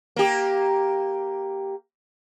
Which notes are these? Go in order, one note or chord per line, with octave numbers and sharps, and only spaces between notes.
A#3 G4